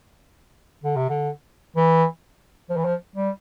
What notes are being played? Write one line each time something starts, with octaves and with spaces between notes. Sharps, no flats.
D3
C3
D3
E3
F3
E3
F3
G3